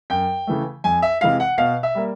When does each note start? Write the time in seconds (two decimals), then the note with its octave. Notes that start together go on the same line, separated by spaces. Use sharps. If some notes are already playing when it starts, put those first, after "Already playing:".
0.10 F#2 G5
0.47 C#3 E3 A3
0.84 F2 G#5
1.02 E5
1.21 C3 E3 G#3 F5
1.40 F#5
1.58 B2 F5
1.83 E5
1.95 G3 A#3